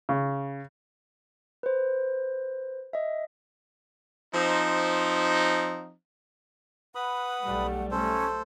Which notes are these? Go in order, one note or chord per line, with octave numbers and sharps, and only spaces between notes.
C#3
B4 C5
D#5 E5
F3 C4 D#4
B4 F#5 B5 D#6
B1 G3 A3
A3 C#4 A4 C5